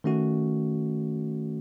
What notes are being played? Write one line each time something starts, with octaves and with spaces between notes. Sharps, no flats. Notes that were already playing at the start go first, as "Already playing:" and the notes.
D#3 A3 C#4 F#4